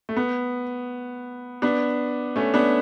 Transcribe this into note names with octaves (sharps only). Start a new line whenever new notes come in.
A3
B3
B3 D4
A3 C#4
B3 D4